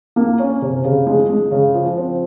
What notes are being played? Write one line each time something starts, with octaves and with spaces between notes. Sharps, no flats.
A#3
C#4
C3
C#3
G#3
G#3
C#3
F3
C4